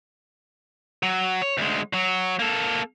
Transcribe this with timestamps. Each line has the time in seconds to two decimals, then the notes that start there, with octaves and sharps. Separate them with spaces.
1.03 F#3
1.42 C#5
1.58 D2 G#3
1.93 F#3 F#4
2.39 A#3 A4